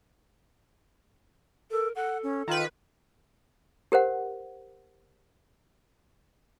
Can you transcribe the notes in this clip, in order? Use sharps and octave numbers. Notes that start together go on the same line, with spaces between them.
A4 A#4
A4 F#5
C#4
D#3 F4 B4
G4 A#4 C5 F#5